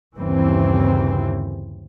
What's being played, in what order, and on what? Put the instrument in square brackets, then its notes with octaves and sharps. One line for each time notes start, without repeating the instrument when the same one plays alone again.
[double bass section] G1 D#2 C#3 E3 C4